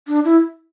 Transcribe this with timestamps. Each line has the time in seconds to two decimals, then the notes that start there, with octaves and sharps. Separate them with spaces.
0.08 D4
0.25 E4